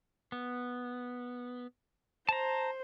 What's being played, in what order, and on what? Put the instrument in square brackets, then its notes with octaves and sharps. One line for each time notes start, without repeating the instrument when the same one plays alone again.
[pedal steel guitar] B3
[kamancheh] C5 [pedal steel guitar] A5 A#5